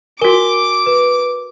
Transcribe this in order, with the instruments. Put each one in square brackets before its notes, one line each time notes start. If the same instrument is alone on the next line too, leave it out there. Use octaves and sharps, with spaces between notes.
[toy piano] F#4 A#4 [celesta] G#5 G7 [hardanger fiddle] D6
[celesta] B4